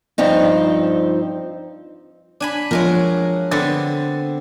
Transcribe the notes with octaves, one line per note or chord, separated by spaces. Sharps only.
G2 F3 C4 D#4
D4 G#5 B5
F3 F#3 G#3 A#4
D3 B3 C4 A6